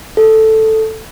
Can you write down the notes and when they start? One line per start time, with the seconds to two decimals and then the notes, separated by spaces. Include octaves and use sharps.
0.17 A4